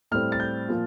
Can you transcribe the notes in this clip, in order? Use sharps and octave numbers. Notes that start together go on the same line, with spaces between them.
A2 G3 C4 F6
A6
G6
A#2 F3